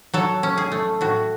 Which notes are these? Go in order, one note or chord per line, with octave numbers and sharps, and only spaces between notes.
F#3 A4
C#4
G#4
A3
A2 F#4